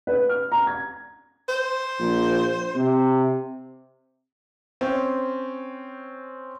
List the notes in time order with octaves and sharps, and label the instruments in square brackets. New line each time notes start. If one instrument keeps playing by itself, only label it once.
[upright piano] B4
F6
A#5
G#6
[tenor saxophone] C5
[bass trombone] A#1
C3
[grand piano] C4 C#4